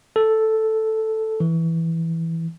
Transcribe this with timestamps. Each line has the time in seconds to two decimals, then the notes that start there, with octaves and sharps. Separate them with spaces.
0.16 A4
1.40 E3